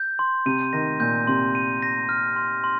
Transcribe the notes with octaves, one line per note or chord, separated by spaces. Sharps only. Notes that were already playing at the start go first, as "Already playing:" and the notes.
Already playing: G6
C6
C3 D#7
D#3 A#6
A#2 G6
C3 C6
D#7
A#6
F6
C6
C6